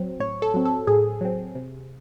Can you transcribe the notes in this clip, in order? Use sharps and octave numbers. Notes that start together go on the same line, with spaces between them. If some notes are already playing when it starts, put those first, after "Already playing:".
Already playing: A2 F#3 C4
A2 C#5
A4
F#3 C4
A4
A2 G#4
F#3 C4
C3